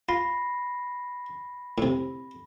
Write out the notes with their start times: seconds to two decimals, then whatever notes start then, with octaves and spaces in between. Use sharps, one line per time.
0.09 F4 B5 A#6 C7
1.78 A2 C3